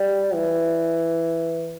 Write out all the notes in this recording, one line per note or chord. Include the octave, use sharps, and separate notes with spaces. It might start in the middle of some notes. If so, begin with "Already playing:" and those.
Already playing: G3
E3